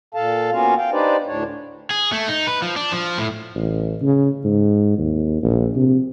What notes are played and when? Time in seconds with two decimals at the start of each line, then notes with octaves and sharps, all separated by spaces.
0.14 A#2 A4 F5 A5
0.52 A#3 B3 C#4 F4 F#4 F5
0.77 F5 G5
0.91 D4 D#4 G4 B4 C5 D5
1.26 D2 A2 D4 C#5
1.91 G#4
2.13 A3
2.28 D#4
2.47 B4
2.62 F3
2.76 D4
2.92 F3
3.18 A2
3.55 A1
4.02 C#3
4.44 G#2
4.98 D#2
5.43 A#1
5.76 C3